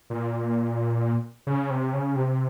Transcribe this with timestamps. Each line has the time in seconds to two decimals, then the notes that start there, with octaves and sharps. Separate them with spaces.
0.10 A#2
1.47 C#3
1.70 C3
1.93 C#3
2.16 C3